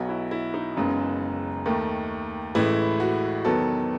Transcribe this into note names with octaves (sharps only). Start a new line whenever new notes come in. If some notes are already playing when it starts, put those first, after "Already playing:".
Already playing: B1 B2 F#3 B3 F#4
E4
E4
D#4
F#1 F#2 C#3 G#3 B3
D#2 D#3 A3
A1 A2 E3 G#3 E4
F#4
E2 D#3 F#3 B3 A4